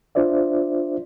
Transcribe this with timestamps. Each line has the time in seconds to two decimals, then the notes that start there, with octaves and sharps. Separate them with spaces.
0.15 D4 F4 C5 D5 E5